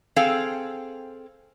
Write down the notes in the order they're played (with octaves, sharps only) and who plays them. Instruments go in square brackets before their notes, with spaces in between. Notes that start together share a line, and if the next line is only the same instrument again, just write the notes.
[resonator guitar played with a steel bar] C4 G#4 A4 F5 G5